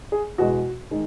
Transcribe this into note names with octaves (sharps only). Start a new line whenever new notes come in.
G#4
E2 B2 G#3 F#4
D#3 G#3